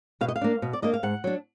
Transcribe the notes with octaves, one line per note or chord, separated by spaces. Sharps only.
B2 F5
D#5
F5
A#3 D4
B2
D5
A#3 D4 D#5
F5
G#2 F#5
F#3 D4